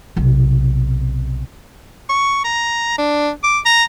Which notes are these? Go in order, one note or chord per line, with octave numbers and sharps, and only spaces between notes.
B1 C3
C#6
A#5
D4
D6
A#5